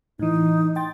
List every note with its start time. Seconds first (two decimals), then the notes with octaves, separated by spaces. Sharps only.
0.19 A2 E3 D#4
0.76 G5 C6 A6